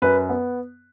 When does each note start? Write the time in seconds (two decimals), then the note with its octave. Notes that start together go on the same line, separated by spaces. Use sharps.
0.02 F#2 B4
0.29 B3